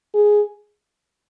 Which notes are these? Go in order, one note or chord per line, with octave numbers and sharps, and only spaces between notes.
G#4